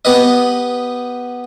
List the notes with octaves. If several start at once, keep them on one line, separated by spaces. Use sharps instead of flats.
B3 G4 B4 D#5